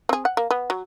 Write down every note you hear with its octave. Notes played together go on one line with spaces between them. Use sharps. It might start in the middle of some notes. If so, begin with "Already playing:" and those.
C4 G#4
F#5
A#3
B3
F#3